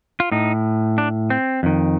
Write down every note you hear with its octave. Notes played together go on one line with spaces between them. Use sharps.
F4
A2 D#4
D4
C4
F2 D#3